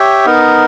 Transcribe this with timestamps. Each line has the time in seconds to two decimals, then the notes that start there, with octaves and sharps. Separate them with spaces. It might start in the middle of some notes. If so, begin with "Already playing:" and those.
Already playing: G4 C#5 E5 G5
0.26 B3 D#4 A#4